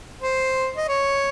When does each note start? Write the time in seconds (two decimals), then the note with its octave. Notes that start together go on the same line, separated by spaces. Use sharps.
0.22 C5
0.77 D#5
0.88 C#5